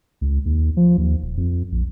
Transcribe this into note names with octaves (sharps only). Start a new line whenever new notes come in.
C#2
D#2
F3
D#2
D#1
F2
A#1